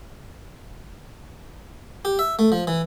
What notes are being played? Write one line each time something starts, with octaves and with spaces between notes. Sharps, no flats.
G4
E5
A3
F3
E3